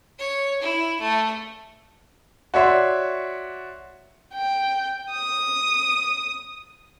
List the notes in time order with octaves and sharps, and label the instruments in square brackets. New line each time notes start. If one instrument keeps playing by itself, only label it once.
[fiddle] C#5
E4
A3
[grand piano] F#4 C#5 D5 E5 C6
[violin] G5
D#6